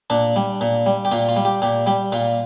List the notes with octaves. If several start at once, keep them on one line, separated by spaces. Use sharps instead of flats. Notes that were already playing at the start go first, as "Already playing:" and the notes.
A#2 D4
G3
A#2
G3
G4
A#2 F4
F4
G3
G4
A#2 G4
G3 G4
A#2 F4